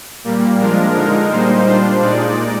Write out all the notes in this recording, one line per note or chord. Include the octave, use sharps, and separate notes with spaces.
A#2 G3 A#3
F3 G#3 D4 F4 A#4
D3 G#3 D#4 A#4
A#2 G3 A#3 D#4 C5
G3 D4 F4 C5
A#2 G#3 D#4 D5